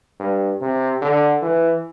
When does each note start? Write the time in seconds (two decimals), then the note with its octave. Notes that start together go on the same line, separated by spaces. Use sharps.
0.20 G2
0.61 C3
1.02 D3
1.43 E3